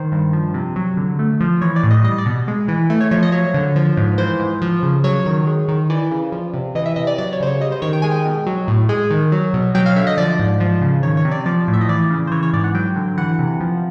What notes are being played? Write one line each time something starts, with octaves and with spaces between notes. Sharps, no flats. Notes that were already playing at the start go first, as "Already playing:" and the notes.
Already playing: D#3 C5
G2
F3
C3
F#3
D3
A3
F3
E3 C#5
D5
A2
D#5
G3 D#5
D5
B2
G#3
E3
A3
C#5
F3 C#5
D#5
F#3 C#5
D3
F3
G#2
E3 C5
G#2
F3
C#3
F#3 C#5
D#3
G#3
D#3
E3 D5
C#3
F3
C3
E3 D#5
E5
C3 D#5
D5
F#3 D5
C#5
C#3 C5
C#5
G3 D#5
C5
D#3 C#5
G5
G#3 G#5
G5
B2
F#3
A2
G#3 G#5
D#3
F#3
B2
F#3 G5
F5
D3 E5
D#5
F3 D5
G#2
F3
C#3
D#3 C#5
C#5
C3
D5
F3 D5
A2
E5
D#5
E3 D5
C#3
C5
E3 C#5
C#5
G#2 D5
F#5
F#3 G5
D3
E3 F#5
C3
F3